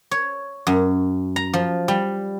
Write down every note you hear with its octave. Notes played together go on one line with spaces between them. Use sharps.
C#5
F#2
A#5
F3
G3